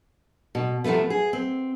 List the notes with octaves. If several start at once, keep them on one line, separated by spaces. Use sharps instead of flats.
B2
C3 F3 F#3 A3 B3
G#4
C4